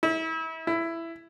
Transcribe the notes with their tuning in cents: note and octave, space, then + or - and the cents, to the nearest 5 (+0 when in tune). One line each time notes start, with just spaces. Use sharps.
E4 -35
E4 +10